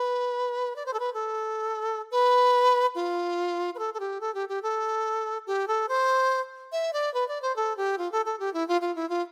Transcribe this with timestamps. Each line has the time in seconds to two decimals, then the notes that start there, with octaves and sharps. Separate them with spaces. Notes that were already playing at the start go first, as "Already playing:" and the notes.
Already playing: B4
0.76 D5
0.86 C5
0.94 A4
1.00 B4
1.14 A4
2.11 B4
2.95 F4
3.75 B4
3.79 A4
3.94 A4
4.00 G4
4.21 A4
4.35 G4
4.49 G4
4.63 A4
5.47 G4
5.68 A4
5.89 C5
6.72 E5
6.93 D5
7.14 B4
7.28 D5
7.42 C5
7.56 A4
7.77 G4
7.98 F4
8.12 A4
8.26 A4
8.40 G4
8.54 E4
8.68 F4
8.81 F4
8.96 E4
9.09 F4